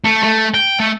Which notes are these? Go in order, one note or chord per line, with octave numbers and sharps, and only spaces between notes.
A3
A3
G5
A3